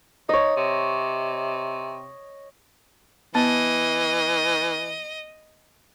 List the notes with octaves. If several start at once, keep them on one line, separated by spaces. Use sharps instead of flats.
D#4 C#5 D#5
C3
E3 B3 D#5